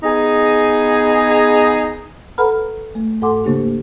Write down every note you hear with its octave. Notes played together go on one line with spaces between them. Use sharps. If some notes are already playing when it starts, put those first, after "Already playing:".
B3 D#4 G#4
A4 B4 F#5 A#5 B5 F6
A3
G#2 A4 F#5 G#5 C6 D6
C#3 A#3 D4 G4